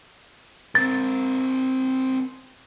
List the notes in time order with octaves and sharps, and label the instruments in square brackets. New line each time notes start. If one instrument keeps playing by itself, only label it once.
[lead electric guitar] C4 A#4 [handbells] A6